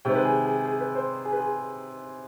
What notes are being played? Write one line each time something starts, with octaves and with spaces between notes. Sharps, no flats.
C3 D#3 G#3 C4 G5
B4
G#4
G#4
G#4
B4
C5
G#4
B4
G#4